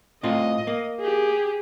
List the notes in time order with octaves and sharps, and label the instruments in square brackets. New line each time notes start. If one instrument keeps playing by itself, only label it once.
[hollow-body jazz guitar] A2 C4 F4 [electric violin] D#5
[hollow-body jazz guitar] A#3
[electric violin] G4 G#4